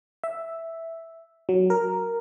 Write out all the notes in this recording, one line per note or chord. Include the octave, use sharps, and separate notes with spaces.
E5
F#3
A#4